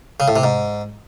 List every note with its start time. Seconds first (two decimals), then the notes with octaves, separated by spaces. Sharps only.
0.20 C#3
0.28 A2
0.36 C3
0.44 G#2